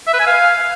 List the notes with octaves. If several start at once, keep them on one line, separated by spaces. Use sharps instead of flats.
E5
B4
G#5
F5